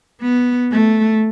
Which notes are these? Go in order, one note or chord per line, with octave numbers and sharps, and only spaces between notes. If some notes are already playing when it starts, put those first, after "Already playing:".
B3
A3